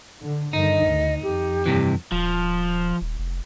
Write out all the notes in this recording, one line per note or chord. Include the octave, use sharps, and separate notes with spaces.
D3
G2 D3 D#3 D#4 D#5
D2
F2 G4
G2 C3 E3
D#1 F3
D#1
F1